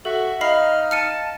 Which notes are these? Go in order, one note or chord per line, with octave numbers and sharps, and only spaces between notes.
F#4 A4 E5
D#4 D#5 F5 A#5 B5 F6 C7
A5 F6 C#7 D#7